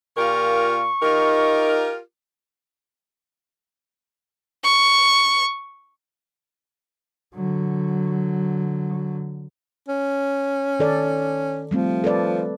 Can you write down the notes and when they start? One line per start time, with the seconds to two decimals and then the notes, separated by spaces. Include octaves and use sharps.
0.18 A#2 F4 G4 A#4 C#6
1.03 D#4 F4 G4 A#4
4.64 C#6
7.34 D3 F#3
9.88 C#4
10.79 D#3 A4 D5
11.71 F3 G3 A3 C4
12.04 A4 B4 D5